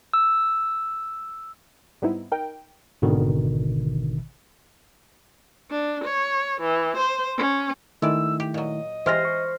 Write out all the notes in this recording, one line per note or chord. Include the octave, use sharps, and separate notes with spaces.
E6
G#2 G3 B3 C4 D#4 E4
D#4 A#4 G5
G#1 B2 D3 D#3
D4
C#5
E3
C5
C#4
D#3 G#3 A3 E4 D5 E6
G4
A#2 F#3 D#5
E3 G#3 F4 G4 C5 F6 A#6
C#6